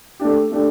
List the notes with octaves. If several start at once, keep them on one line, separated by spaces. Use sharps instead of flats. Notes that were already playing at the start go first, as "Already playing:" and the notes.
A3 D4 G4
A3 D4 G4